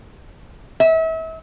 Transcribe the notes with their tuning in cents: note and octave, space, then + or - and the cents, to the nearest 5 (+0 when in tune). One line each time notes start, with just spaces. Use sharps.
E5 -35